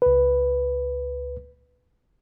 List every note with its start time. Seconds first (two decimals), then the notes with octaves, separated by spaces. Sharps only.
0.02 C#2 B4